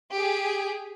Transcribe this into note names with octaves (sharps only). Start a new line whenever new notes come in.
G4 G#4